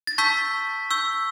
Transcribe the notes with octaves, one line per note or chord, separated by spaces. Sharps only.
A6
A5 C#6 E6 G6 B6
C#6 E6 G6